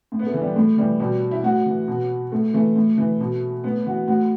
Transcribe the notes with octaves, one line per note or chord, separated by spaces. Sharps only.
A2
B3
A3
E3
G3
A2 A3
E3 G3
B2 G3
E4
A2 F#4
E3
B2
A2 A3
E3 A3
A2
E3
B2
A2 B3
E3 F#4
A2 F#4